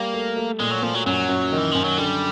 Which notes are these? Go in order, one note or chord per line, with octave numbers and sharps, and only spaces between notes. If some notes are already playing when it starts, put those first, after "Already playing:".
Already playing: G3 A#3
A3
A3
A#2 G#3
F#3
A#2 F3
F#3
F#2 F#3
F#2
D#3
E3
F#2 F3
F#3
D3 G3